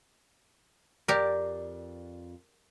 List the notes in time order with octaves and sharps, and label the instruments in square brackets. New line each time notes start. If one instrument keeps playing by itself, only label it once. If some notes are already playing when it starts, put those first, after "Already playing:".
[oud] F2 D5 [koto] G4 A#4